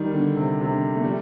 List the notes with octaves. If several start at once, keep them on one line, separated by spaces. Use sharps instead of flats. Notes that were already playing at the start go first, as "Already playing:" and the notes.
Already playing: D#3 G3
D3
C3
C3
D3
A3
G3